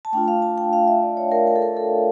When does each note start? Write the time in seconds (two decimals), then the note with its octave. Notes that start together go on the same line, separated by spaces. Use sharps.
0.05 A5
0.13 A3 D4 F4 G5
0.28 F5
0.42 A5
0.58 G5
0.73 F5
0.87 E5
1.03 D5
1.17 C#5
1.32 A#4
1.47 A#4
1.56 A4
1.62 A#4
1.77 A4